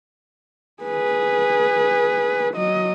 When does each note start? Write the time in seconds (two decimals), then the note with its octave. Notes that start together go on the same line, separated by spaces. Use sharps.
0.83 G#4 B4
2.54 F#3 D#5